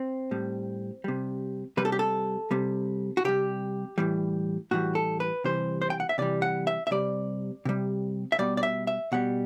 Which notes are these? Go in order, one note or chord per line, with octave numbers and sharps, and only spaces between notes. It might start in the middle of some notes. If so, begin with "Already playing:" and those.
Already playing: C4
A2 G3
C3 G3
C3 G3 B4
A4
G4
A4
C3 G3
F#4
C3 G3 G4
A2 E3 G3
A2 E3 G3 F#4
A4
B4
C3 E3 G3 C5
C5
G5
F#5
E5
C3 E3 G3 D5
F#5
E5
E5
C3 G3 D5
C3 G3
E5
B2 G3 D5
D5
E5
E5
B2 G3 F#5